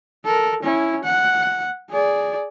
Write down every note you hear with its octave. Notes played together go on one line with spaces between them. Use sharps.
A4 A#4
C#4 E4
F#5
G#4 D5